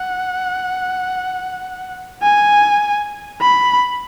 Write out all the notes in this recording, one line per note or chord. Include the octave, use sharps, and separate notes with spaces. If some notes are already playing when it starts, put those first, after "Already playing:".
Already playing: F#5
G#5
B5